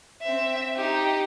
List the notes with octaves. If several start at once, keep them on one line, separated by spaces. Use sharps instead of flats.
C4 E5
D#4 G4